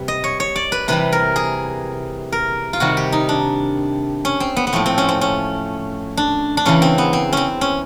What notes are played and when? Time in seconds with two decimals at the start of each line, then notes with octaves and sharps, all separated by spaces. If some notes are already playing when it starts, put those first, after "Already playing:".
Already playing: C3 G3 B4
0.08 D#5
0.24 C#5
0.40 C#5
0.56 D5
0.72 B4
0.88 C3 E3 G3 B4
1.12 A#4
1.36 G#4
2.32 A#4
2.73 F4
2.80 C3 D#3 G3 F#4
2.97 G4
3.12 D#4
3.29 D4
4.25 C#4
4.40 C4
4.57 B3
4.67 B3
4.73 A2 F3 A3 C4
4.86 C4
4.98 C#4
5.09 C4
5.21 C#4
6.17 D4
6.57 D4
6.65 E2 C#3 E3 C#4
6.82 C4
6.98 B3
7.13 C4
7.33 C4 C#4
7.61 C#4